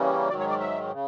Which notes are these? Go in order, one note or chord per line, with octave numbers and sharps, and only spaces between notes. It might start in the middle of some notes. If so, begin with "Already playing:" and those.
Already playing: C#3 E3 G3 A#3 C#4
G#2 D#3 F#3 D5
C#5
D5
E5
C#3